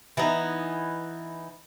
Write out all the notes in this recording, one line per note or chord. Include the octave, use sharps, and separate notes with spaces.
E3 B3 D#4